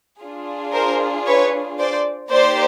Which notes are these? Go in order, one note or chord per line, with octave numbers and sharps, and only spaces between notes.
D4 F4 G#4
A#4 C5
B4 C#5
C5 D5
A#3 D#4 G4 C5 D5